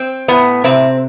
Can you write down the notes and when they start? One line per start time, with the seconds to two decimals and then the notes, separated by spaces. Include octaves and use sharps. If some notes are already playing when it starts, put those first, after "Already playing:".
Already playing: C4
0.28 A2 B3
0.64 C3 C4